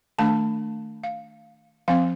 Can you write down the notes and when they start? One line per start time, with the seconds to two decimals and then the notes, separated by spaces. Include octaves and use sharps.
0.18 D#3 A3 D4 A5
1.04 F5
1.88 F3 C4 F5